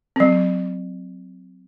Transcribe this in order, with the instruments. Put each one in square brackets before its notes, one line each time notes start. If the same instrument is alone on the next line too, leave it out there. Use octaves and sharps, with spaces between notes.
[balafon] F#3 C4